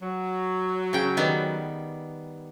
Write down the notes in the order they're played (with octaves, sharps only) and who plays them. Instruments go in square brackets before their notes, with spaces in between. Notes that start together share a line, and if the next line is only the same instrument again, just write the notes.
[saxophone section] F#3
[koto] C#3 G5
D#3 G3 B3